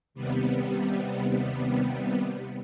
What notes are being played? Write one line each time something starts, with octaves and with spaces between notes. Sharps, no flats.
D#2 C3 G3 B3